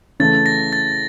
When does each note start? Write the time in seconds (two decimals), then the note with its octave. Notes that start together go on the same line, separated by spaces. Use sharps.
0.20 C#3 E3 A3 A6
0.46 A#6
0.73 A6